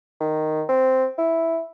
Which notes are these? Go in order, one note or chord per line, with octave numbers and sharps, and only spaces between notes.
D#3
C4
E4